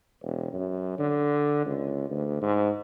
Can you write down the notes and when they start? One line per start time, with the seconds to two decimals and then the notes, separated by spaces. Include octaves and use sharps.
0.22 E1
0.53 F#2
0.99 D3
1.66 C#2
2.11 D2
2.42 G#2